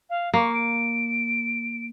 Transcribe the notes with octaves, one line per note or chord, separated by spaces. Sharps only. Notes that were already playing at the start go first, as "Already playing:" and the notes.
F5
A#3 C#6
D7